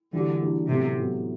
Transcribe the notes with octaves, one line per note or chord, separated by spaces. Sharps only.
D3 E3 G3 A#3 D4 F#4
E3 G3 A#3 D4 F#4
A2 C3 F#3 B3
A2 F#3 B3